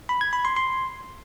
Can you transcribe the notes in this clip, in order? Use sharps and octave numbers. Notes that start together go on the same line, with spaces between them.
B5
G#6
B5
C6
C6